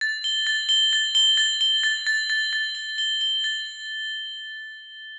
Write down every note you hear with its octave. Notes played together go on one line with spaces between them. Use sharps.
A6
G7
A6
G7
A6
G7
A6
G7
A6
A6
A6
A6
G7
G7
G7
A6